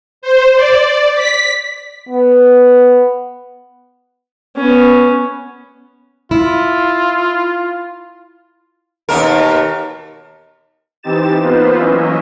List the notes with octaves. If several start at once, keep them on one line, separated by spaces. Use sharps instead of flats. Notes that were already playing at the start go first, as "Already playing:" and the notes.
C5
D5
B6
B3
B3 C#4
E4 F4
D#2 B2 A#4
E3 C4 D#4 G4 A6 E7
A#3 B3 D#4 F4 B4 C5
E3 F#3 A#3 C#4 D#5 E5